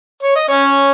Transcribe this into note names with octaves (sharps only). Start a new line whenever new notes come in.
C#5
D#5
C#4 C#5